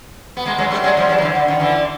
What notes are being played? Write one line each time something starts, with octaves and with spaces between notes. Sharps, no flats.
B3
G#3 A#3
F#3 G#3
G3 A3
F#3 G#3
F3 G3
E3 F#3
F3
D3 E3
D3
D#3
D3 E3